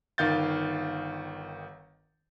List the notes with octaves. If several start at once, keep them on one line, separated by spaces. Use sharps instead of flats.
G1 D#3 F5 G6 A6